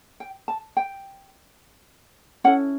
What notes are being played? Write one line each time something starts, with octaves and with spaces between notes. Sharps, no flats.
G5
A5
G5
C#4 E4 A4 F#5